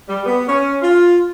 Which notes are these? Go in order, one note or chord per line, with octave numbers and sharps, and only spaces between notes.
G3
B3
C#4
F4